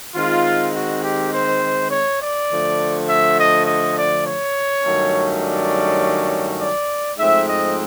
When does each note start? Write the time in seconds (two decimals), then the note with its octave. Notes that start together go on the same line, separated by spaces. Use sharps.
0.16 D#3 G#3 C4 F4
0.74 F#4
1.03 G4
1.33 C5
1.91 C#5
2.20 D5
2.50 D3 F3 A3
3.08 E5
3.38 D#5
3.67 D#5
3.97 D5
4.26 C#5
4.84 G2 D#3 F#3 A3 C#4
5.43 D5
6.60 D5
7.18 G#2 F3 A3 C4 E5
7.47 D#5